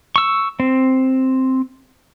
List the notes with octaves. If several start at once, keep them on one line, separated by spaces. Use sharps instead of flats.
C#6 E6
C4